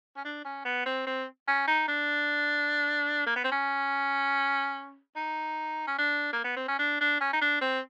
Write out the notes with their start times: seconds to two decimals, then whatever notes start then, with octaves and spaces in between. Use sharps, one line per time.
0.16 C#4
0.24 D4
0.45 C#4
0.65 B3
0.86 C4
1.07 C4
1.48 C#4
1.67 D#4
1.88 D4
3.27 A#3
3.36 B3
3.44 C4
3.51 C#4
5.16 D#4
5.87 C#4
5.98 D4
6.33 A#3
6.44 B3
6.56 C4
6.68 C#4
6.79 D4
7.01 D4
7.20 C#4
7.33 D#4
7.41 D4
7.61 C4